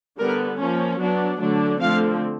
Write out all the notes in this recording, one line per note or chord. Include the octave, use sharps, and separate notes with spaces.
D3 G3 B3 A#4
F3 A#3 C#4
F#3 B3 D4
D3 F#3 A3 D4
D3 F3 A3 C4 F5